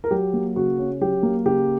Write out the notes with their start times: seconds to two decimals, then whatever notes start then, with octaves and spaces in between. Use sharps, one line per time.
0.04 A#4
0.11 F#3 G4
0.34 A#3
0.56 C#3 F#4
0.78 C#4
1.01 F#3 G4
1.23 A#3
1.45 C#3 G4